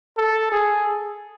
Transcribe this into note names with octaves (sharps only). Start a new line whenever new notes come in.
A4
G#4